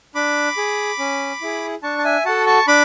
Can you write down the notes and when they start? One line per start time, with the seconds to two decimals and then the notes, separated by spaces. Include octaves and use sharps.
0.15 D4 B5 D6
0.57 G#4
0.99 C#4
1.41 E4 G#4
1.83 D4 A5 C#6
1.98 A5
2.04 E5 G#5
2.25 F#4 A4 F#5 A5
2.46 A5 C#6
2.67 D4 B5 D6